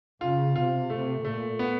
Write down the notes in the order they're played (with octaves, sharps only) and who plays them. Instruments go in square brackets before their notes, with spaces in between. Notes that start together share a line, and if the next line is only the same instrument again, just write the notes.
[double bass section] C#3 [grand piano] F4
[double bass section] C3 [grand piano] F4
[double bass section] C3 [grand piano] A3
[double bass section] A#2 [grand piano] A3
[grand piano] B3